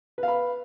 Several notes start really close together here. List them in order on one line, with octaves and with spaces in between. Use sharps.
B4 F5 B5